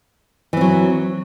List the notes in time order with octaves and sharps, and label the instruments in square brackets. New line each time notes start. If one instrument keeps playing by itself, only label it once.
[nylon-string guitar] E3
C4
F#3